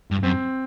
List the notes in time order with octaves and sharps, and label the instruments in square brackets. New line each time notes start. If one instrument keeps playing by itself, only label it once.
[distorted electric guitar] G2
[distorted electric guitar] F#2 [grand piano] C4